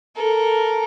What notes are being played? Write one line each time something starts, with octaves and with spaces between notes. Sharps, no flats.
A4 A#4